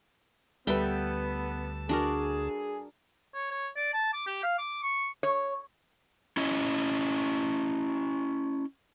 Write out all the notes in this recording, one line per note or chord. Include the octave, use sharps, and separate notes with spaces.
D2 G3 B3 A4 B4 E5 G5 A5
D4 F#4 G#4 A#4
C#5
C#5
D5
A5
D6
G4
F5
D6
C#6
C#5
C#4 E4 D#5